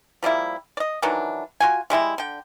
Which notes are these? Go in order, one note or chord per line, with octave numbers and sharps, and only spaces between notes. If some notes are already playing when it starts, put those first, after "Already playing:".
F3 G3 A#3 E4
D5 D#5
D#3 E3 F#3 D4
F4 F#4 G#5
G3 G#3 E4 G4
D3 G5